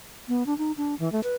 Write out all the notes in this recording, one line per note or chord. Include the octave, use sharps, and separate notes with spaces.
B3
D4
D#4
D4
E3
A3
B4